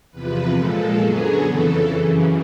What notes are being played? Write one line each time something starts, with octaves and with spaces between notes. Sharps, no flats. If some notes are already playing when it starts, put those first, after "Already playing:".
E2 C3 F3 B4
A#2 F3 G#3 A4
F#2 D3 F#3 B3 G#4
F2 C#3 E3 A4
F#2 C#3 E3